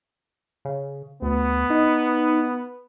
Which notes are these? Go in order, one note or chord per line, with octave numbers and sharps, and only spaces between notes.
C#3
D2 B3
D#4